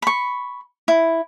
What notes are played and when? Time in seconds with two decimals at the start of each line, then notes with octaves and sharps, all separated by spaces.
0.02 B5 C#6
0.88 E4